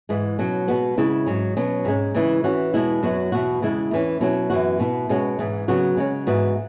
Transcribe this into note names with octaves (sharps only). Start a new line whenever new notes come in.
G#2 E3 G#3
B2 F#3 C#4
B2 G#3 B3 F#4
C#3 G#3 E4
G#2 F#3 C#4
B2 F#3 C#4
G#2 G#3 C#4
C#3 E3 G#3 E4
E3 C#4 F#4
E2 B2 G#3 E4
F#2 F#3 B3 F#4
E2 B2 B3 F#4
E2 C#3 G#3 E4
E2 E3 C#4
B2 F#3 C#4 E4
F#2 E3 B3 F#4
B2 B3 E4
B2 G#3 C#4 F#4
G#2 E3 G#3
C#3 F#3 B3 F#4
C#3 G#3 C#4
G#2 E3 B3 F#4